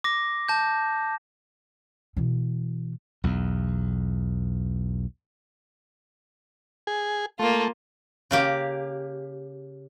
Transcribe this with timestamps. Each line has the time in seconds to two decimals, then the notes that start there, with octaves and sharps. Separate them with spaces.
0.04 D6 A#6
0.48 A5 G6
2.17 B2 E3
3.24 B1 E2
6.87 G#4
7.39 A3 A#3 F4
8.31 C#3 A#3 G4